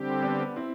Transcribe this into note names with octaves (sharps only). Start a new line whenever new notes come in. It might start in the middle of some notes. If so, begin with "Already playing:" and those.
Already playing: D3 G3 C4 G4
B3 D4
C4 E4